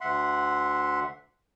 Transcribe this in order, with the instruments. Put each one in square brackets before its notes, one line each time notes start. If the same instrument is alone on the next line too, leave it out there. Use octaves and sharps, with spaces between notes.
[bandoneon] D2 E5 F#5 C6